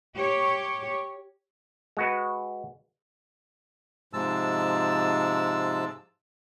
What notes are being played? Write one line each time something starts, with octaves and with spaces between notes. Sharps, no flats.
G4 C#5
G#3 F#4 B4
G#2 C3 F3 G#3 A5 E6